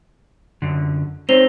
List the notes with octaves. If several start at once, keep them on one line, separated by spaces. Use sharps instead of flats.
F#2 D3
C4 D#4 C5 C#5 F7 G7